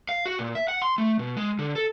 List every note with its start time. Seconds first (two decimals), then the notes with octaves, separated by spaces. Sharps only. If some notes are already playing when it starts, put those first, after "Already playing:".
0.09 F5
0.26 F#4
0.39 A#2
0.55 E5
0.68 F#5
0.82 C6
0.98 A3
1.19 B2
1.37 G#3
1.59 D3
1.75 A4